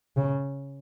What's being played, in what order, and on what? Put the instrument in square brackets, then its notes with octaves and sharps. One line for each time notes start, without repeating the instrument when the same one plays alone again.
[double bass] C#3